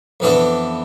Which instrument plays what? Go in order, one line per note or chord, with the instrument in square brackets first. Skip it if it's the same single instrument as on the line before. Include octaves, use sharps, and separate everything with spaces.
[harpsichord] F2 E3 B3 D4 A4